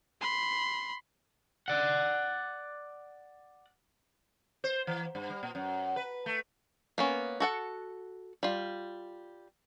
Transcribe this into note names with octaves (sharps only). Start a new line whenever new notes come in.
B5 C6
D5 F#5
C5
E3
G2
G3
A#2
F#2
B4
A3
A#3 B3 C#4
F#4 A4 F#5
G3 F4